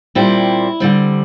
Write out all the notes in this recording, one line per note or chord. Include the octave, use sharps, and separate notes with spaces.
A#2 G3 C4 E4
D3 G3 C4